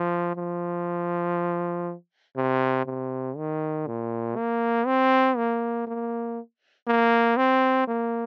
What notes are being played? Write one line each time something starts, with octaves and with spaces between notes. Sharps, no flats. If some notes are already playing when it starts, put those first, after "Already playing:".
Already playing: F3
F3
C3
C3
D#3
A#2
A#3
C4
A#3
A#3
A#3
C4
A#3